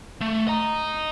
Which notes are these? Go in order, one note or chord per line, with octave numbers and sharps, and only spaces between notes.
A3
D#5 A#5